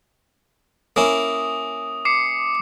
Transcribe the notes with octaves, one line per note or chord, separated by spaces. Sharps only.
A#3 C#4 E4 D#6
D6 C7 C#7